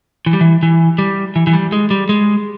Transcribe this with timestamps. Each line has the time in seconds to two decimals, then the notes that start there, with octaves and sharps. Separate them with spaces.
0.26 E3
0.33 G3
0.41 E3
0.63 E3
0.98 G3
1.36 E3
1.47 E3
1.53 G3
1.72 G#3
1.91 G3
2.09 G#3